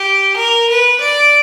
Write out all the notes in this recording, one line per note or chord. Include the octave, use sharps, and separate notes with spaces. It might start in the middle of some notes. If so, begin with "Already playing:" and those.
Already playing: G4
A#4
B4
D5